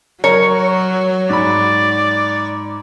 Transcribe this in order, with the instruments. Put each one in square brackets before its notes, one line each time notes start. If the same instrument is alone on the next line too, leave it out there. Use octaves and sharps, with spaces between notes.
[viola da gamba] F#3 [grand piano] A#4 [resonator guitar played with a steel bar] C#5
[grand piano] G#2 B5 [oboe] D5